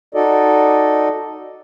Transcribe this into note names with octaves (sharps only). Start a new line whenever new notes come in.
D#4 F#4 A4 D5 D#5